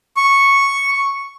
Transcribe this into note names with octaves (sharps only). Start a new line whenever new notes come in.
C#6